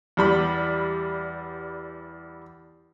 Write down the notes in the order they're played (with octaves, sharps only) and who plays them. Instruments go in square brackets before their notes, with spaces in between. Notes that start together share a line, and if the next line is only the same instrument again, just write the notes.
[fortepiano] E2 G3 B5